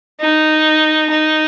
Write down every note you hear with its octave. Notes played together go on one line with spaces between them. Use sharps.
D#4
D#4